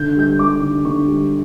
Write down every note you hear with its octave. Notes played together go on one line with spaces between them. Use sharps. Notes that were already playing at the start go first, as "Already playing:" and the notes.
Already playing: D3 G6
G3 G6
G3 D6
D3
D3 C#6
G3